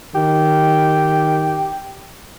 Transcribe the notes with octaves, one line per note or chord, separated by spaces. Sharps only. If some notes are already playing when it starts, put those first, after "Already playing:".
D#3 G4